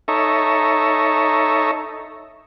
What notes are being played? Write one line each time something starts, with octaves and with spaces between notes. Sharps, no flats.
D#4 A4 C#5 E5 A#5